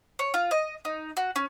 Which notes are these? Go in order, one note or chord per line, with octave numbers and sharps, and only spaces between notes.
C#5
F4
D#5
D#4
F#4
C#4